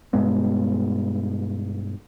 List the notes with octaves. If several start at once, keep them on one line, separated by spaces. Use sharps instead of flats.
G2 B2 G#3 B3